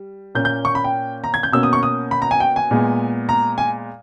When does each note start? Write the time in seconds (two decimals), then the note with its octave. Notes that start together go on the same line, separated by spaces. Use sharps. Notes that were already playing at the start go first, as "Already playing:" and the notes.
Already playing: G3
0.35 A#2 A#3 C#4 G6
0.45 G6
0.65 C#6
0.75 B5
0.84 G5
1.24 A#5
1.34 G#6
1.43 G6
1.52 B2 A#3 C#4 E6
1.63 D#6
1.73 C#6
1.83 D#6
2.11 B5
2.22 A#5
2.31 G#5
2.40 G5
2.56 G#5
2.71 A#2 G#3 B3
3.29 A#5
3.58 G#5